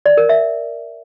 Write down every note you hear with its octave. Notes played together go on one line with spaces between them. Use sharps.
D5
A#4
E5